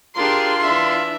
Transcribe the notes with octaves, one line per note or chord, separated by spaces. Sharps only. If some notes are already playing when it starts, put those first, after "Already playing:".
D4 F4 G4 G#4 A#4 C6
E3 D4 E5